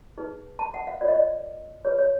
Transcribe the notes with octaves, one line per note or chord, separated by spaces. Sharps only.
D#4 G#4 B4
A5
F#5
F5
F4 A#4 C#5 D5
D#5
D5
F4 G#4 B4 C#5
C#5